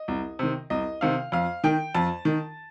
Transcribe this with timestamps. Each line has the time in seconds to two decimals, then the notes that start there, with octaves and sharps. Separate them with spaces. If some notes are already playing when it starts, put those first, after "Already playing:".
Already playing: D#5
0.08 C2
0.39 C3 D#3
0.70 C2 D#5
1.01 C3 D#3 F5
1.32 F2 F5
1.64 D#3 G5
1.94 F2 A5
2.25 D#3